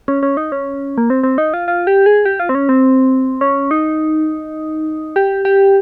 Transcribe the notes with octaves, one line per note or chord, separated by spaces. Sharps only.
C#4
C#4
D#4
C#4
A#3
C4
C4
D#4
F4
F4
G4
G#4
G4
F4
C4
C#4
C4
C#4
D#4
G4
G4